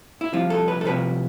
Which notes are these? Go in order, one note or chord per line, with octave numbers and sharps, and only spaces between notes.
E4
C2 C3 F3 F4
A4
B4
A4
C2 C3 F3 B4